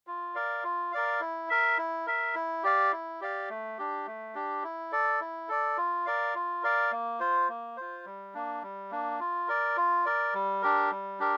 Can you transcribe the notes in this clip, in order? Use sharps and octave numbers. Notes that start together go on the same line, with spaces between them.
F4
A#4 D5 F5
F4
A#4 D5 F5
E4
A#4 E5
E4
A#4 E5
E4
G4 D5 F5
E4
G4 D5 F5
A3
D4 G4
A3
D4 G4
E4
A4 D5
E4
A4 D5
F4
A#4 D5 F5
F4
A#4 D5 F5
A#3
F4 C5
A#3
F4 C5
G3
A#3 D4
G3
A#3 D4
F4
A#4 D5
F4
A#4 D5
G3
D4 G4 A#4
G3
D4 G4 A#4